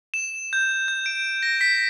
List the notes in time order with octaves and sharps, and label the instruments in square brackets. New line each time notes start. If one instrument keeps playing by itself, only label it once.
[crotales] E7
G6
G6
D7
A#6
B6